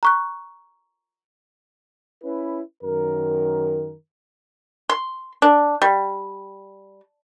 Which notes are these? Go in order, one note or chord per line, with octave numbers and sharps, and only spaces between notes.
A#5 C#6 F#6
C#4 E4 B4
F#2 D#3 A#4
C6
D4
G3